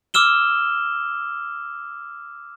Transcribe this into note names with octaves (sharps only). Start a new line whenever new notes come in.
D6 E6 F6 E7 G7